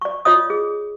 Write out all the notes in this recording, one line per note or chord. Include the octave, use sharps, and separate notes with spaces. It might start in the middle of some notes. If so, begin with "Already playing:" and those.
D5 C#6
F4 C#5 D#5 D#6
G#4